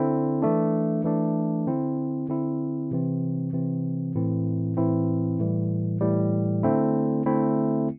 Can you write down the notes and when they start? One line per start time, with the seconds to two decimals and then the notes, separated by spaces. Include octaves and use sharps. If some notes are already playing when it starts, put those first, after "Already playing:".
Already playing: D3 C4 E4
0.42 E3 A3 D4
1.04 E3 A3 D4
1.67 D3 C4 E4
2.29 D3 C4 E4
2.91 C3 E3 C4
3.53 C3 E3 C4
4.15 A2 E3 C4 E4
4.77 A2 E3 C4 E4
5.39 A2 E3 G3
6.01 A2 E3 G3
6.63 D3 A3 C4 E4
7.26 D3 A3 C4 E4